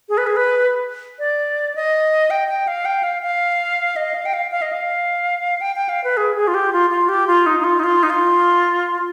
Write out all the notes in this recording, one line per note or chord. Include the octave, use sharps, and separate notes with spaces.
G#4
B4
G#4
B4
D5
D#5
G5
G5
F5
G5
F5
F5
D#5
F5
G5
F5
F5
D#5
F5
G5
G5
F5
B4
G#4
G#4
F4
G4
F4
F4
G4
F4
D#4
D#4
F4
D#4
F4
D#4
F4